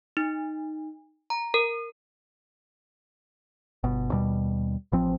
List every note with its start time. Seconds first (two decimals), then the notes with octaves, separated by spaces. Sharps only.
0.17 D#4
1.30 A#5
1.54 A#4
3.83 G1 B2
4.12 D#2 B2 G3
4.92 A1 F3 C4